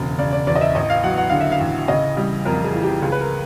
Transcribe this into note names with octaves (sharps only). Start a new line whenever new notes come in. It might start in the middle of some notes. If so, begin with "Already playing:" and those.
Already playing: E1 C#3
C#3 D5
D5
E2 D5
D#5
E5
A1 D#5
F5
F#3 F#5
F#5
D3 F5
E5
F5
A1
C#3 D#5
G3
F2 A#4
G#4
E3
G4
C#2 G#4
B4
A#4